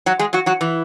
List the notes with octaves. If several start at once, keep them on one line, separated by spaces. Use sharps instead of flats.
F#3 F#4
G#3 G#4
F#3 F#4
F#3 F#4
E3 E4